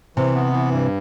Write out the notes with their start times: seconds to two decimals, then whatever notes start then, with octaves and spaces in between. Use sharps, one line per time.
0.17 C3 E3
0.35 B3
0.53 E3
0.71 G2